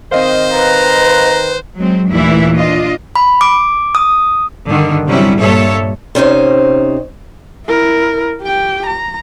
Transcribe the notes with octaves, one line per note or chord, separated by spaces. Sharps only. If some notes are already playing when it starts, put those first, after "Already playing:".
D#3 C4 C5 D#5 F5
B4 A#5
F#3 G#3 C4
D#2 A#2 E3 A3 D4 E4
D4 F4 D#5
B5
D6
D#6
G2 D3 D#3
C3 F#3 G3 C#4 E4
G2 A#2 G3 A4 C#5 E5
C3 C#4 D#4 C5
E4 A#4
G4 G5
A#5